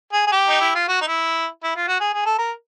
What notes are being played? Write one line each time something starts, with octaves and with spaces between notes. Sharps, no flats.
G#4
G#4
G4
D#4
E4
F4
F#4
D#4
E4
E4
F4
F#4
G#4
G#4
A4
A#4